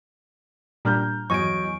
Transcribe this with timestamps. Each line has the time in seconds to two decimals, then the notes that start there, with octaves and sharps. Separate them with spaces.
0.85 A#2 G3 D4 A#5 F6 G6
1.30 E2 F#3 D#5 G#5 C#6 D7